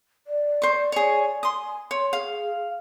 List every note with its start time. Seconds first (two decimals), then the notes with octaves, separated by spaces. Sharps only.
0.27 D5
0.62 C5 C#6
0.92 G#4 C#5
1.43 G#5 C6 D#6
1.91 C#5 C6
2.13 G#4 F5